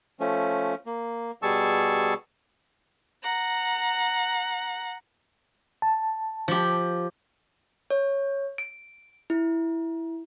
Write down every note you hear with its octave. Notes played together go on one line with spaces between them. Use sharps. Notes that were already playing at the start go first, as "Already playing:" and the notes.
F3 A3 C#4
A#3
B2 G3 G#4 A5 C#6 E6
F#5 A#5
A5
F3 G4
C#5
D7
E4